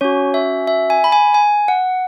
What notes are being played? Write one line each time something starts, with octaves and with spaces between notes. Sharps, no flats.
C#4 F#4 C#5
E5
E5
G#5
B5
G#5
G#5
F#5